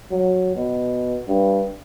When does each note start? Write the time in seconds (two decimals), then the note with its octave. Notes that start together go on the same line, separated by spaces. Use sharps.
0.11 F#3
0.56 B2
1.28 G2